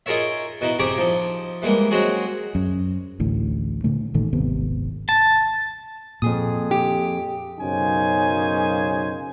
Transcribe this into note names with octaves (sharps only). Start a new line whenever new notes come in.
D#4 F4 G#4 A#4 C#5 E5
B2 D#4 E4
C3 G4 G#4 A#5 C#6 D6
F3 D#4
E3 G3 G#3 A#3
F#3 G#3 C4 C#4 F#4 G#4
F#2
A1 D2 A2
A#2 D3 A3
A1 A#2 D#3 A3
D#1 G#1 C3 B3
A5
F2 A#2 G#4 D#6
G4
B1 F#2 C#3 D#4 C5 G#5